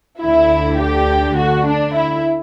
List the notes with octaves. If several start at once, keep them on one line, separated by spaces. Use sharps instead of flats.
D2 D3 E4
G4
F#4
D4
E4